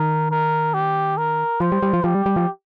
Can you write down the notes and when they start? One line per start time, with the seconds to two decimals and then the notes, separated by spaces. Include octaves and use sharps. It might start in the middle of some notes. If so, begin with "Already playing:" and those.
Already playing: D#3 A#4
0.31 A#4
0.74 G4
1.18 A#4
1.60 F3 C5
1.72 G3
1.83 G3
1.93 F3
2.04 F3 G4
2.15 G3
2.26 G3
2.36 F3